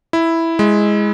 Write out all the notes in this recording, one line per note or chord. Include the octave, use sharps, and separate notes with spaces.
E4
G#3